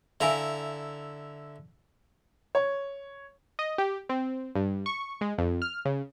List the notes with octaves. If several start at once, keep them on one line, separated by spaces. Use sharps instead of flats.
D3 E4 E5 F5 G#5 A#5
C#5
D#5
G4
C4
G2
C#6
G#3
F2
F6
C#3